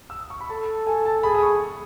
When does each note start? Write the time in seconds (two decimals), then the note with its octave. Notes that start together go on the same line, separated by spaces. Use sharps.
0.10 E6
0.20 D#6
0.30 C#6
0.41 B5
0.50 A4 A5
0.87 A4 G#5
1.06 A5
1.23 G#4 B5
1.35 D#6
1.42 C#6